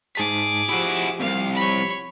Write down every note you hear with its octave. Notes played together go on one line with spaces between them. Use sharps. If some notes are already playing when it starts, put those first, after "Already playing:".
G#2 G#4 A5 D6 B6
F3 E4 F#4 G4
C2 F2 F5
C#5 B5